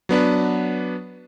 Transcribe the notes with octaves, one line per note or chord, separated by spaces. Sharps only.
F#3 B3 D4 B4